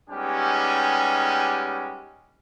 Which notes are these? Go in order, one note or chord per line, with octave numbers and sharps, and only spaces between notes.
G3 G#3 B3 C#4 D#4 G4